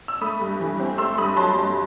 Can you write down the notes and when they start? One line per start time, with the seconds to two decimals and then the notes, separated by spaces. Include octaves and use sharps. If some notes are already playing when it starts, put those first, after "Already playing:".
0.08 E6
0.21 A3 B5 D#6
0.41 G2
0.60 E3
0.80 C4
0.98 A3 C6 E6
1.17 G2 B5 D#6
1.36 F#3 A5 C6
1.56 G2